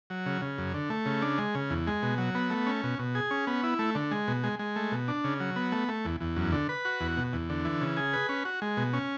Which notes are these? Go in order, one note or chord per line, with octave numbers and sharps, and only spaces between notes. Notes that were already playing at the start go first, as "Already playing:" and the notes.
F#3
C#3
C#3
F#2
D3
A3
C#3
D4
G#3
C#3
E2
G#3
B2
F#3
B3
A3
C#4
B2
B2
G#4
C#4
B3
E4
A3
D3
G#3
B2
G#3
G#3
A3
B2
D4
C#3
F#3
B3
A3
A3
E2
E2
F#2
D3
B4
F#4
E2
B2
E2
D3
E3
C#3
G#4
B4
C#4
F#4
G#3
B2
C#4